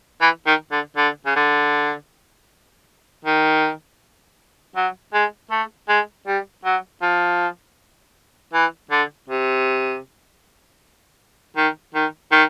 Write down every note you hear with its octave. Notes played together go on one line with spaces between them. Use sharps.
E3
D#3
D3
D3
C#3
D3
D#3
F#3
G#3
A3
G#3
G3
F#3
F3
E3
D3
C3
D#3
D#3
D#3